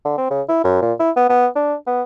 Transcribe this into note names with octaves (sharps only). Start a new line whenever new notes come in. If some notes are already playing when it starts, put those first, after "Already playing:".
D3
C4
C#3
E4
F#2
A#2
E4
B3
B3
D4
B3